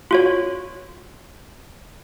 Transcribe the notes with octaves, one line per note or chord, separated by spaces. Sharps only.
F4 F#4 C#5